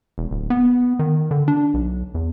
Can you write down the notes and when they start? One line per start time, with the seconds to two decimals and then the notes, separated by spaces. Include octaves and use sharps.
0.18 E1
0.31 D1
0.50 B3
0.99 D#3
1.31 D3
1.48 D4
1.74 B1
2.15 E2